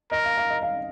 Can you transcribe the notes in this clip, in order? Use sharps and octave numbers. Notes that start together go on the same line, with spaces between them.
A#4 D#5
F5
F5
D#5
F5